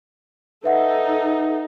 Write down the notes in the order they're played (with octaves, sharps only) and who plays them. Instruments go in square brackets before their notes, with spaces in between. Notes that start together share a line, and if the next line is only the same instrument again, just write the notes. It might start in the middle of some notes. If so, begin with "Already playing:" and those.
[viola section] D#4 A4 [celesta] B4 E5 F#5